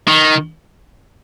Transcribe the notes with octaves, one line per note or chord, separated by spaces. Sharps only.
D#3